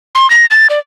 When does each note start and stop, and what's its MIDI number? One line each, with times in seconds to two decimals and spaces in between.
0.15 0.29 84
0.30 0.46 94
0.51 0.67 93
0.70 0.79 74